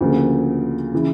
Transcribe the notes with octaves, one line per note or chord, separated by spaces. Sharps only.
D2 C#3 F3 A#3
C#3 E3